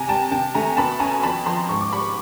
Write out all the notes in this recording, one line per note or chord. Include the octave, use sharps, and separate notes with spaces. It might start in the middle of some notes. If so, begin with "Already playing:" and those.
Already playing: C3 G#5 A#5
G3 G5 A5
C3 G5 A5
A3 G#5 A#5
B2 A5 B5
C#4 G#5 A#5
F2 A5 B5
F3 A#5 C6
G#2 C#6
D6
G3 B5 C#6